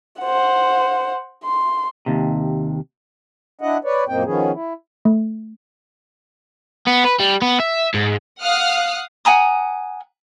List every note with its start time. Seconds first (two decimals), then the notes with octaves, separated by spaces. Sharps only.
0.21 C5 F#5
1.44 C6
2.06 D#2 C3
3.61 D4 E4 D#5 F#5
3.84 B4 C#5 D5
4.08 F#2 A#2 A#3 C4 D#4 G5
4.25 D#3 F3 B3 C#4 G#4
4.53 E4
5.05 A3
6.87 B3
7.04 B4
7.19 G3
7.42 B3
7.60 E5
7.94 G#2
8.42 F5 F#5 D#6 F6 F#6
9.25 F#5 G#5 A#5 D#6